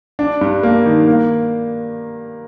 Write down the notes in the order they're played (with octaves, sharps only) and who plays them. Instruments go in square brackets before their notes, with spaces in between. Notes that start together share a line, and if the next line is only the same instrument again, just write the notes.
[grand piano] D4
G2
A#3
D#3
A#3